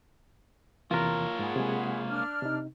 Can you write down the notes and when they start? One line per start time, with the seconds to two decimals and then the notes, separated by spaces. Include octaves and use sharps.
0.91 E2 C3 E3 A#3 F4 A#4 C#5
1.39 G#2 G#4 F#5 B5
1.56 C3 G#3
2.10 D4 F6
2.43 C3 D#4